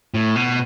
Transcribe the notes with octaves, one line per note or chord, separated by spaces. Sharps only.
A2
B2